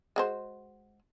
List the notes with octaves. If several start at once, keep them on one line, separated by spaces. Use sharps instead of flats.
G#3 F#4 C5